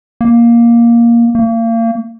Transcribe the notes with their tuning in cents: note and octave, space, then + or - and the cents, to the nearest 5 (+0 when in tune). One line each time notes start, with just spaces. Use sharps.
A#3 +10
A#3 -35